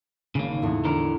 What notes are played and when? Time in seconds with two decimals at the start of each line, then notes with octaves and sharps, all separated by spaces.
0.35 G#1 C#3 A#3
0.62 E2 A2
0.85 D3 A#4